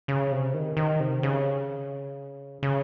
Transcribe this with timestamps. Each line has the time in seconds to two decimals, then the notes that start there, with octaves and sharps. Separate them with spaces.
0.08 C#3
0.31 C3
0.54 D#3
0.77 D#3
1.00 C3
1.23 C#3
2.63 C#3